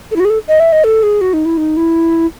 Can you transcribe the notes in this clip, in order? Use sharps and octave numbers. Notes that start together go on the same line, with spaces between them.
A4
E4
F#4
G#4
A4
D#5
E5
D#5
A4
G#4
F#4
D#4
E4
D#4
E4